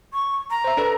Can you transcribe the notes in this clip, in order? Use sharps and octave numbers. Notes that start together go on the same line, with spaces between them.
C#6
A#5
C5 E5
D4 A4 B4